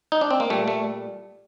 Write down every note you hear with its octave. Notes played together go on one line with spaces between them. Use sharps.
D#4
D4
C4
A#3
A#2 G3 A3
A3